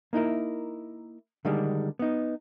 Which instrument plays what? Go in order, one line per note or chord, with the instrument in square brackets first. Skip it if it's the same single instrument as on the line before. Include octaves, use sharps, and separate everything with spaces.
[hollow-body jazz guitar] A#3 D#4 E4 A#4
D3 D#3 G3 G#3 D4
B3 D#4